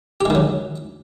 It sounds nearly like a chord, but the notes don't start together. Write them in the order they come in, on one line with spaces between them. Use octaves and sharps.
G4 G#3 D#3 F#3